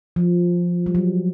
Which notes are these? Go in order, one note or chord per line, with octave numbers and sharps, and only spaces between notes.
F3
G3
F#3